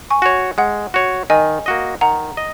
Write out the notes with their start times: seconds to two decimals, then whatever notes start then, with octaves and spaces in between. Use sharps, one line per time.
0.10 G#5 C#6
0.22 F#4 C#5
0.58 G#3 F#5
0.94 F#4 C#5
1.30 D#3 D#5 G#5
1.66 A#3 F#4 D#5
2.01 D#3 F#5 A#5
2.37 D#5